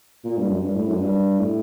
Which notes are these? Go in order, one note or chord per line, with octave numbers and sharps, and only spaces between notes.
A#2
G2
F#2
G2
A2
F#2
G2
A2